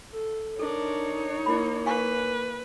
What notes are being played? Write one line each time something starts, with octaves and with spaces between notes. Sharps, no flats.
A4
D4 D#4 A4 A#4 C#5
A#3 E4 B5
B4 F5 G#5 C#6